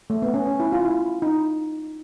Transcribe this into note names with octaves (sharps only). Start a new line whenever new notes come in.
A3
B3
C#4
C#4
E4
F4
E4
D#4